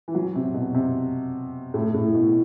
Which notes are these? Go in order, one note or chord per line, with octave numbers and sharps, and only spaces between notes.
E3
F#3
C3
B2
C3
A2
A2
B2